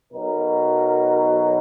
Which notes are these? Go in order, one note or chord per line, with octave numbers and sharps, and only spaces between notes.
B1 B2 F#3 A#4